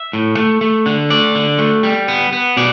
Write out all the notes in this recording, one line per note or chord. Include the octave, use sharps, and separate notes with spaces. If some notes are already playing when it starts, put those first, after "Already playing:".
Already playing: E5
A2
A3
A3
D3
A3 D5
D3
A3
G3
B3
B3
B2 D5